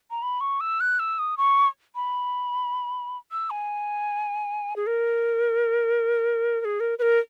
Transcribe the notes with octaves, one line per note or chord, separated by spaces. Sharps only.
A#5
B5
C#6
E6
F#6
E6
D#6
C#6
B5
E6
G#5
G#4
A#4
A#4
G#4
A#4
B4
A#4